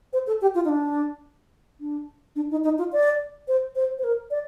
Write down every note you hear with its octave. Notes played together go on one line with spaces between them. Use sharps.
C5
A4
G4
F4
D#4
D4
D4
D4
D#4
D#4
F4
D5
C5
C5
C5
A#4
D5